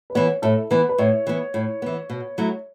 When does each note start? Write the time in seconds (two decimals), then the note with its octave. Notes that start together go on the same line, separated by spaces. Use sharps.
0.10 B4
0.15 E3 B3 C#5
0.42 A2 A4
0.71 E3 B3 B4
0.89 B4
0.98 A2 C#5
1.27 E3 B3
1.54 A2
1.82 E3 B3
2.10 B2
2.38 F#3 A3 E4